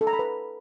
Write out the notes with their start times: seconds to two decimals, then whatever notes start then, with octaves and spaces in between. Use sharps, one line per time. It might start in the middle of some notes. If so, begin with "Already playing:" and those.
0.01 A4
0.07 A#5
0.13 B5
0.19 B4